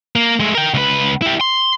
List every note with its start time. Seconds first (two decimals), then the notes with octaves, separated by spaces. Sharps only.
0.16 A#3
0.40 G#3 A3
0.55 A#4 G5
0.74 C#2 B4
1.22 E4 G4
1.41 C6